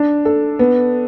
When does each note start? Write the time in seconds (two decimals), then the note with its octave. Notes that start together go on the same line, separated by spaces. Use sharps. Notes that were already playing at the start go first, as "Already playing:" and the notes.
Already playing: D4
0.25 A4
0.59 B3